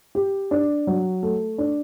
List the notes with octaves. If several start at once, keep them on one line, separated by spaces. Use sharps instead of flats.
G4
D4
F#3
A3
D4